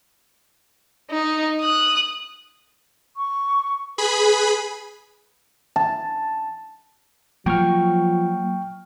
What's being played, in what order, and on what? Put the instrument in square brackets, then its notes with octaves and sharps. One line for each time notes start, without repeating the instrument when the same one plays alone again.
[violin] D#4
D#6 F#6
[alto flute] C#6
[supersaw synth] G#4 B5 [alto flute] B4
[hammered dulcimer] A5
[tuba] F3 [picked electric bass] F#3 A#3 [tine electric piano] G5 C#6 F6